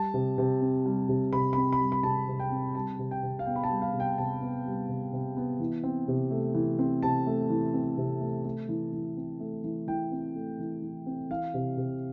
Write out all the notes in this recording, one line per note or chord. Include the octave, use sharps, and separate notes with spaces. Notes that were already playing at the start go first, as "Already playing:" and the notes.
Already playing: G3 A5
C3
C3
C4
G3
C3
C3 B5
C4 B5
B5
G3
B5
C3 A5
C3
G5
C4
G3 A5
C3
G5
C3
F5
B3 G5
B5
A5
G3
F5
C3
G5
C3 A5
B3
G3
C3
C3
B3
E3
C4
C3
A3
E3
C4
C3 A5
A3
E3
C4
C3
A3
A3
E3
E3
C4
A3
E3
E3 G5
C4
A3
E3
E3
C4
E3 F5
C3
C3